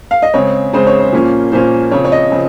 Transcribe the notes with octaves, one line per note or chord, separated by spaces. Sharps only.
F5
D#5
C#3 G#3 C4 C#5
C#3 G#3 C4 C5
C#5
C5
A#2 F3 A#3 C#4
A#2 F3 A#3 C#4 C5
C#3 F3 C4 C#5
C#5
D#5
C#3 F3 C4